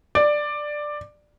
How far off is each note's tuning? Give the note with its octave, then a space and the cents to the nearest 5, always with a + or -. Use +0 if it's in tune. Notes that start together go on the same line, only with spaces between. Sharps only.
D5 +10